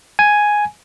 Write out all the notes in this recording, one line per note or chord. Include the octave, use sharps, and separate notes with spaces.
G#5